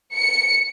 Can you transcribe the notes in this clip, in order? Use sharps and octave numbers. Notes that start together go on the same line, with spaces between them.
C#7